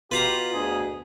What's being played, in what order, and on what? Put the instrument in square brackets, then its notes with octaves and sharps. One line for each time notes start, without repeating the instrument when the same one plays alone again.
[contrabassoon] B2 [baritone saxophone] F4 [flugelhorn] G4 [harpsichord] B4 F5 A#5
[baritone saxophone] D2 [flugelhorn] G#4